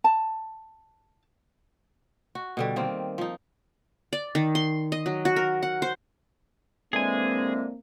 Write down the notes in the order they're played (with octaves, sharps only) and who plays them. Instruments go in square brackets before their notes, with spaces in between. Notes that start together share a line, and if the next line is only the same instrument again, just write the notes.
[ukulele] A5
[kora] F#4
B2 D3 G3
D#3 A#3 C4
F3 D#4
[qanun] D5
D#3
C6
D#5
F#3
F#4
A#4
F#5
C5
[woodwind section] D3 E3 G#3 [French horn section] A#3 C4 [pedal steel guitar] G#4 G#5